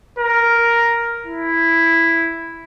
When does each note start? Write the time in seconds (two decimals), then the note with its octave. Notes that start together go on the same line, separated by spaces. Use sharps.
0.18 A#4
1.27 E4